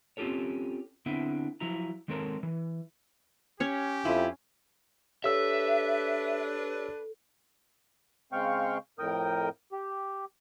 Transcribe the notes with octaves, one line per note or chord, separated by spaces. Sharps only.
C4 C#4 F4 G4 A4 C#5
D3 B3 C4 E4 E5
F3 F#3 E4 A#5
D#3 G#3 C4 A4 A#4 C#5
E3
C#4 G4 C#5
F2 E4 F4
D4 G4 A4 B4 C#5 E5 E6
C#3 G#3 C4 F5 G5 C#6
F2 A2 A#4 G5 D#6
G4